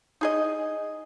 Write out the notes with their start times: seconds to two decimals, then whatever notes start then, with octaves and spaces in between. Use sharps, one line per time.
0.21 D#4 G#4 D#5